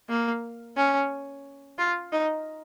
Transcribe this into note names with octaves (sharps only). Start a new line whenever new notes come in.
A#3
C#4
F4
D#4